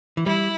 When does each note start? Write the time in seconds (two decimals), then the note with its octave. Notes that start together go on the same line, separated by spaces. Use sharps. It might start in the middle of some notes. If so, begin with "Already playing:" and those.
0.17 E3
0.26 G3 E4